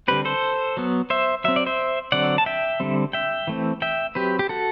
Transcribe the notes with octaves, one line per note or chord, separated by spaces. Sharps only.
D3 G3 C4 G4 B4
A4 C5
F#3 B3
C5 E5
F#3 C4 E5
D5
C5 E5
D3 F#3 C4 D5 F#5
A5
E5 G5
D3 G3 C4
E5 G5
E3 A3 C4
E5 G5
F#3 C4 G4 B4
G4
F#4 A4